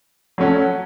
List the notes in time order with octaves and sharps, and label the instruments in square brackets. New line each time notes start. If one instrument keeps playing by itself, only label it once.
[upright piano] F#3 A3 C#4 F#4